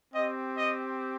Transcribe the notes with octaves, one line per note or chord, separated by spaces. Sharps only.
C4 G4 D#5
D#5